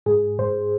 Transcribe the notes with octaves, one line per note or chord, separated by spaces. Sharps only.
G#2 G#4
G#2 C5